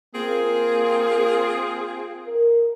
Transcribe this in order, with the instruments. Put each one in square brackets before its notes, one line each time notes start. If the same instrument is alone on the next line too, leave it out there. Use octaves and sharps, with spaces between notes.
[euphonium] A#3 [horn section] C4 F4 G#4
[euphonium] A#4